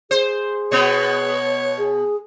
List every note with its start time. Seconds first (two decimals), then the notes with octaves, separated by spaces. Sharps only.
0.11 G#4 C5
0.72 B2 B3 C#5
1.78 G#4